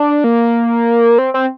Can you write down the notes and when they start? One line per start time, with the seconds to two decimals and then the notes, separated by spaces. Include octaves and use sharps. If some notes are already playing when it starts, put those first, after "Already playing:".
Already playing: D4
0.24 A#3
1.18 C4
1.34 C4